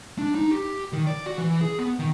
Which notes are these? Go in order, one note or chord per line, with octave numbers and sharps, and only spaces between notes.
D4
D#4
G4
D#3
D5
F#4
E3
G#4
B3
D#3